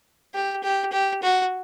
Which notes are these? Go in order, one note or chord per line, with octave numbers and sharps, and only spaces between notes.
G4
G4
G4
F#4